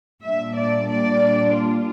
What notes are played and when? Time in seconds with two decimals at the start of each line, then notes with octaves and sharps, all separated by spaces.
0.22 A#2 G3 D4 E5
0.56 D5
0.90 D5
1.57 F4